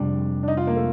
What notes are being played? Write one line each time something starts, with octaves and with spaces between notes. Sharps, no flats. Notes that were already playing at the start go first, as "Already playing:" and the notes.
Already playing: F2 C3 G3 D4
D4
D#4
F4
A#3
A3